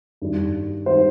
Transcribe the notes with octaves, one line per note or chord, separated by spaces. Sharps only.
G2 D#3 G3
D#3 G3 C5